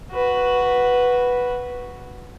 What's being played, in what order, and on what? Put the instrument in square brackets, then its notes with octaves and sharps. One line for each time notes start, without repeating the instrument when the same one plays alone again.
[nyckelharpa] F#4 B4